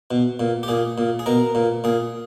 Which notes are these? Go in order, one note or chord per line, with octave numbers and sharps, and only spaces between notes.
B2
A#2
G4
A#2 G#4
A#2
G#4
B2 A#4
A#2
A#2 G#4